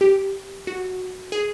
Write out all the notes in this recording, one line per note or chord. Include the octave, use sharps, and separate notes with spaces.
G4
F#4
G#4